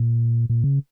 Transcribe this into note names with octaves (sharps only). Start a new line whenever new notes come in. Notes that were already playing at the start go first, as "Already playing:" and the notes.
Already playing: A#2
A#2
C#3